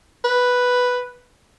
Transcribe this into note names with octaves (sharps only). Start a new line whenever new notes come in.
B4